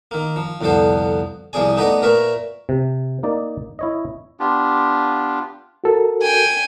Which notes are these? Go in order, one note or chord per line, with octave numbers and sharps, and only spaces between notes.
D#3 A#3
F3
C2 F2 D3 B3 A4 C5
C2 C3 F3 G#4 D5 G#5
A3 B3 D#4 B4 D5 D#5
A#2 A#4 B4 E5 C#6
C3
A#3 D#4 D5
E4 C#5 D#5
B3 D4 F4 G4
F#4 A4 A#4
G5 G#5